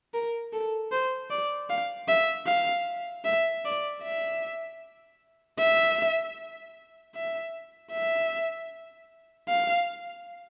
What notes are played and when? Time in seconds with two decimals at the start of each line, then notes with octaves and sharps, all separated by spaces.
0.14 A#4
0.53 A4
0.92 C5
1.30 D5
1.70 F5
2.09 E5
2.47 F5
3.25 E5
3.65 D5
4.03 E5
5.59 E5
7.15 E5
7.92 E5
9.49 F5